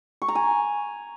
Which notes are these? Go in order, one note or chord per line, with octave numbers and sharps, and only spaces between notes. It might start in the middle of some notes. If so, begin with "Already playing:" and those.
C#6
A#5
G#5